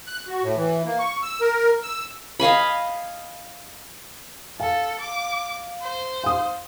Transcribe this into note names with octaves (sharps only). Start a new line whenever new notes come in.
F#6
F#4
A2
E3
A#3
C#6
E6
A#4
E6
D#5 F5 G#5 B5
A4 F5
D6
C5
F5 D#6